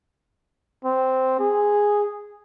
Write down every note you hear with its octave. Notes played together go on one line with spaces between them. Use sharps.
C4
G#4